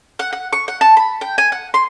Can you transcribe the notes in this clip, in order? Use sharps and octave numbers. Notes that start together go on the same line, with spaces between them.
F#5
F#5
C#6
F#5
A5
B5
G5
G#5
F#5
C6